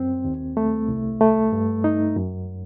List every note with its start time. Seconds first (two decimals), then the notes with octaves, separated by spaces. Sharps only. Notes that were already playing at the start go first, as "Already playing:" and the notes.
Already playing: F#2 C4
0.25 D#2
0.57 A3
0.89 C2
1.21 A3
1.52 G2
1.84 D#4
2.16 F#2